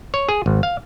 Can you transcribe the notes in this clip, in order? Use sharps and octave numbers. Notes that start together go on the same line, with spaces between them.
C#5
G#4
G#1
F5